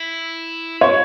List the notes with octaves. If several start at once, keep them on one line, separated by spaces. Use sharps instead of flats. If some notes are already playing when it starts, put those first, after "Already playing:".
Already playing: E4
C#5